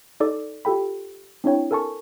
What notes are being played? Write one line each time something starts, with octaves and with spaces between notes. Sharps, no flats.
D#4 A4 D5 D6
F4 G4 A4 G5 B5
C4 D4 E4 C#5 G5
A4 A#4 G#5 A5 C#6